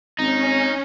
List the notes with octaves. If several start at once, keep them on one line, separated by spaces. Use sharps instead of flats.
G#1 C#4 D#4